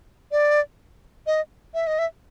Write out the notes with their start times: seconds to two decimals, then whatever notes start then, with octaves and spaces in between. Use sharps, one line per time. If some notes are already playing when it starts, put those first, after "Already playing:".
0.32 D5
1.27 D#5
1.74 E5
1.87 D#5
1.99 E5